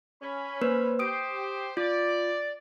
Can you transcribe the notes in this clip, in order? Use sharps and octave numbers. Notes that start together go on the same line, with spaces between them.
C#4 B5
A#3 B4 C5
G4 C5 D#6 D7
F4 D5